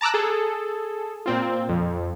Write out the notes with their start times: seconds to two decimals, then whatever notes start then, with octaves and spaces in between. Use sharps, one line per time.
0.01 A5 A#5 D6 E6 F#6
0.14 G#4 A4
1.26 A#2 C4 F4
1.69 F2